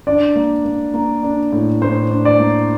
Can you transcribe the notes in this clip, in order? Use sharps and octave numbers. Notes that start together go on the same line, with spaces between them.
D4 D5
A#3
A#3
A#3
D4
A2
A2 C5
D4
D5
A#3